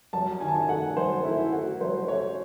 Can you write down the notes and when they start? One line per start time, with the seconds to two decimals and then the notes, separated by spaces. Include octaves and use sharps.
0.13 F#3 A5
0.40 D#3 G#5
0.48 A5
0.55 G#5
0.69 A3 F#5
0.97 F#3 C5
1.25 A3 E4
1.53 A3 F#4
1.81 F#3 C5
2.08 A3 C#5